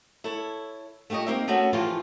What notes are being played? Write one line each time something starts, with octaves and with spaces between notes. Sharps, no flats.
E4 A4 C#5
A3 F4 G4 C#5 D#5
A#3 C4 D#4 G4 E5
A3 B3 C#4 F#4 A4
E3 F3 A3 F4 G4 G#4